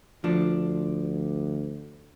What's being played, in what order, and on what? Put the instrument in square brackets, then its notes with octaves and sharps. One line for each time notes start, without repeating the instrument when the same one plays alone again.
[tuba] D2 [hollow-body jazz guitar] F3 D4